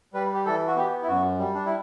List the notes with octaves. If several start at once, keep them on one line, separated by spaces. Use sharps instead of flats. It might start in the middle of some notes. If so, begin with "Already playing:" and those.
G3 B4
G4
E3 A4
F#4
B3 G4
E4
F#2 F#4
G3
D4
E4